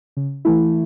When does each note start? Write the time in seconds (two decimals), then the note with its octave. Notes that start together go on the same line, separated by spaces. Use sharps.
0.17 C#3
0.45 E3 A3 E4